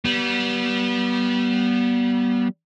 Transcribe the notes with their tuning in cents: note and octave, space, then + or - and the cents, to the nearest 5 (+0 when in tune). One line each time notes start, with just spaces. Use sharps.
G3 -30 B3 -25